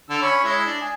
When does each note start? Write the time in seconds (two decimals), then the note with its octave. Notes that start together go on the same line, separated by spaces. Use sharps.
0.09 D3 E6
0.21 C#4 C#5 B5
0.44 G#3 E4
0.66 D4
0.81 G#4